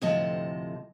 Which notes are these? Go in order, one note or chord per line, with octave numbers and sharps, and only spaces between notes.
D2 A2 C3 F3 D#5 A5